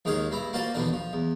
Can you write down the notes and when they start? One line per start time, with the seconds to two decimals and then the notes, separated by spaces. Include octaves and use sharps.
0.05 D#2 G#2 D#3 G#4 C#5 F5
0.31 G2 E4 A#5
0.53 A#3 F4 F#4 C5 D5
0.74 D#2 B2 D3 E3 D4
0.93 F3
1.13 E2